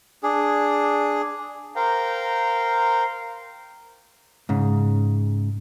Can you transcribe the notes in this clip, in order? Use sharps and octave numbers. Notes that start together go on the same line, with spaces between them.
D4 G#4
A#4 C5 F5 G5 A#5
G#2 C#3